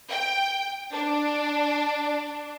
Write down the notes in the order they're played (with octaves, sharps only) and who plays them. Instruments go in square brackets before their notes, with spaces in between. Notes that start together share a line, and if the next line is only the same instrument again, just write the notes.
[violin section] G5
D4